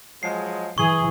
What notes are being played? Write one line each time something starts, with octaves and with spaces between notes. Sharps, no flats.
F3 F#3 G#3 C7
E3 G#4 C#6